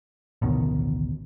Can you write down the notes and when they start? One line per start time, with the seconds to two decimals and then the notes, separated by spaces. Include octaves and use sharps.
0.42 A1 D2 B2 D#3